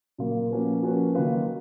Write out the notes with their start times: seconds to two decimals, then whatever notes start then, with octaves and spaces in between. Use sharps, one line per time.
0.18 A#2 F#3 A#3 F4 A#4
0.51 F3 A#3 C#4 F#4 B4
0.83 F3 A#3 C#4 F#4 B4
1.15 D#3 F#3 A#3 F4 B4